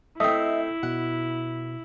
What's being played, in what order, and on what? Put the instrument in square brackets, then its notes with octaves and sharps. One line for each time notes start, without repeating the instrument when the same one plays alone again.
[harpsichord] A3 C4 [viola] E4 [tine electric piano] D#5 E5 [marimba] D#6
[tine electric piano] B2 [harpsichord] F#5